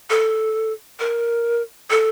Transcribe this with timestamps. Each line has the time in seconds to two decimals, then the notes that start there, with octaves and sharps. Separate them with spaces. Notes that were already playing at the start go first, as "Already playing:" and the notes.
0.10 A4
0.99 A#4
1.90 A4